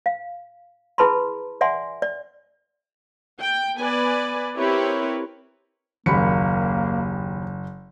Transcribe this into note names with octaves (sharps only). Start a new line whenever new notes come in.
F5
E4 G#4 B4 A5 B5 C6
D5 E5 F#5 G#5 C6
D5
G5
B3 B4 D5 G#5
C4 E4 G4 A#4 B4 C#5
F#1 D#2 A#3 B5 C#7